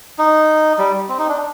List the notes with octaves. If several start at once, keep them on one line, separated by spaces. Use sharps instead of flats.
D#4
G3
C4
D#4
D4